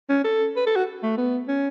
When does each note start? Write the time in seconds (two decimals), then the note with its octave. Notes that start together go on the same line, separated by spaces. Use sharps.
0.09 C#4
0.24 A4
0.56 B4
0.66 A4
0.76 F#4
1.03 A3
1.18 B3
1.48 C#4